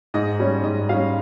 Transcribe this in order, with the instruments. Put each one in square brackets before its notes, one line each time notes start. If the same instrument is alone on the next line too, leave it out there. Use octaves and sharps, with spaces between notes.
[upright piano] G#2 D#5
G3 C#4
G#2 D#5
G3 C#4 F5